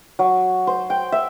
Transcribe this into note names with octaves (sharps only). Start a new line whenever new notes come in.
F#3
C5
G5
E5